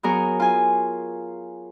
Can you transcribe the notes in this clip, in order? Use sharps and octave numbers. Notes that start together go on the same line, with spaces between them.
F#3 B3 G#4 A#4 C#5
F4 G#5